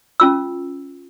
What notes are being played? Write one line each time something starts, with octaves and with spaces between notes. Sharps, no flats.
C#4 F4 E6